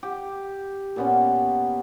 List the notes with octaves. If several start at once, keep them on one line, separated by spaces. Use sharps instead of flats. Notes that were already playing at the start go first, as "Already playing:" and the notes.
G4
A#2 B3 C#4